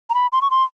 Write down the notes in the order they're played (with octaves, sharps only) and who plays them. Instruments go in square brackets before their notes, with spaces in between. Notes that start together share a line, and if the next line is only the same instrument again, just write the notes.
[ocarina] A#5
B5
C6
C#6
C6